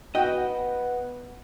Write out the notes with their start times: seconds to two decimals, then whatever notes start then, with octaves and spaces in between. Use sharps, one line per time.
0.15 B3 F#4 D#5 G5